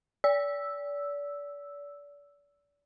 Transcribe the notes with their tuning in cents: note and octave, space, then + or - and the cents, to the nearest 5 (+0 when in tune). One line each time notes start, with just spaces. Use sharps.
D5 -35 E6 +0